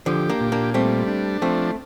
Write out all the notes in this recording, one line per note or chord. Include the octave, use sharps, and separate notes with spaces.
D3 F3 G4
A#3 D4
A#2
A#3 D4
G3 A3 C4
D4
F3 A3 C4